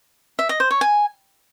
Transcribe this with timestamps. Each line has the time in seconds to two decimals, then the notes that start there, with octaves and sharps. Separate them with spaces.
0.39 E5
0.49 D#5
0.60 C5
0.71 C#5
0.81 G#5